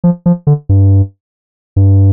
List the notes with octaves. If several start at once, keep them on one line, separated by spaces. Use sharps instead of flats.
F3
F3
D3
G2
G2